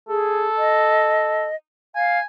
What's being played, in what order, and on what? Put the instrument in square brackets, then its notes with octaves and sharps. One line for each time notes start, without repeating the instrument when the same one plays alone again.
[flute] G#4 [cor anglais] A4
[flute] D#5
[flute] F5 [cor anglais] G#5